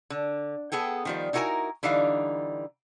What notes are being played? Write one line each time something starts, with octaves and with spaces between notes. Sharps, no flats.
D3
B3 G#4 A4 G5
D#3 F3 G3
D#4 E4 F#4 A#4 G#5 A#5
D3 E3 G3 D#4 F5